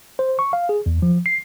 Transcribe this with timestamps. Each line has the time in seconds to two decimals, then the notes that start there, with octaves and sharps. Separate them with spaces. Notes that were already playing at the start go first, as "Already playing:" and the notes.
0.19 C5
0.39 C#6
0.53 F5
0.69 G#4
0.86 E2
1.02 F3
1.26 C7